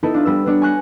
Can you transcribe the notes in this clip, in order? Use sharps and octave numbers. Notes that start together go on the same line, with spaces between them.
B3 D#4 E4 A4 E5
D4 F4
G3 B3 E6
B3 D4 C#5
G#5 C#6 F#6 A#6